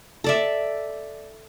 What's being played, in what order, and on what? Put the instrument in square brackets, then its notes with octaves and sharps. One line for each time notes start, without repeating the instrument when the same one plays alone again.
[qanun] A4 D5 E5